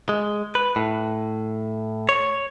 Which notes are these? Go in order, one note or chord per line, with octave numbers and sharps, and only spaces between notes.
G#3
B4
A2
C#5